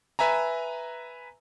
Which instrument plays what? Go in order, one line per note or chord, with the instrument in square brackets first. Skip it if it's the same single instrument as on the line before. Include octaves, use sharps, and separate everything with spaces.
[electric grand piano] B4 E5 G#5 A#5